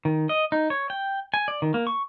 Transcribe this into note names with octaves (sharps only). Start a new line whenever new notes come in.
D#3
D#5
D#4
C#5
G5
G#5
D5
D#3
A#3
C#6